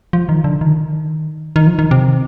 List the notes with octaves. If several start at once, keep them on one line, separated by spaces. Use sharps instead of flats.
F3
D#3
D3
D#3
D#3
F3
D#3
C3